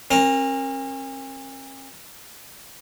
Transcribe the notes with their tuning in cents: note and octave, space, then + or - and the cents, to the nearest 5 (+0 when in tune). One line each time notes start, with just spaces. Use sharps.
C#4 -45 A#4 +0